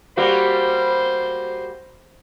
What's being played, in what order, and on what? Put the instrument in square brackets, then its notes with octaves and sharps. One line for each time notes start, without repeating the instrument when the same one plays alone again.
[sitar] G3 A#3 F#4 [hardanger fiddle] C5